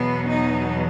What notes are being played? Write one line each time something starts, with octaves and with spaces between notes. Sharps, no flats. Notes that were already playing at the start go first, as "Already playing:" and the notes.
Already playing: E2 B2 F#3 B3
D#4